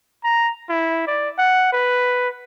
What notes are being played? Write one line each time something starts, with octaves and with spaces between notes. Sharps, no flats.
A#5
E4
D5
F#5
B4